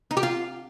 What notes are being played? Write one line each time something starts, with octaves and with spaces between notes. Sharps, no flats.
D#4
G4
F4